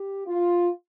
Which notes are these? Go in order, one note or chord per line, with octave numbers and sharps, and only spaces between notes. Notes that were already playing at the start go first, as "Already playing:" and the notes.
Already playing: G4
F4